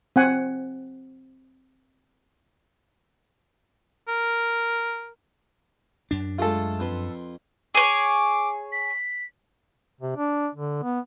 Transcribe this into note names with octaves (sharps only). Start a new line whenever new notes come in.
C4 F#5 G#5
A#4
F#2 D4
G#3 A3 F4 A4
F2 B4 C6
G#4 C#5 D6
B6
C3
D4
D3
B3